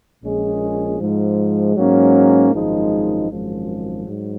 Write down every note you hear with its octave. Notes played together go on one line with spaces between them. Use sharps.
A#1 A#2 G#3 C#4 G#4
G#2 F3 G#3
G#2 F#3 A#3 C#4
G#1 F#2 F3 G#3 D#4
G#1 F#2 F3 G#3
G#2 F#3